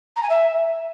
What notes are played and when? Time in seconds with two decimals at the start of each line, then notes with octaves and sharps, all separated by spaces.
0.16 A#5
0.23 G#5
0.29 E5